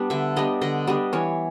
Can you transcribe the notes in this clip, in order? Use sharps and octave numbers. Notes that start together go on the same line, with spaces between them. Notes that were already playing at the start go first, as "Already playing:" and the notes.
Already playing: G3 B3 D4
D3 E5
G3 B3 D4 D#5
D3 D#5
G3 B3 D4 D#5
E3 C#5